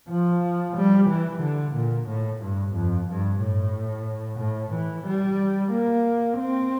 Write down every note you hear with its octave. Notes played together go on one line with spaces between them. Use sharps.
F3
G3
E3
D3
A#2
A2
G2
F2
G2
A2
A2
E3
G3
A#3
C4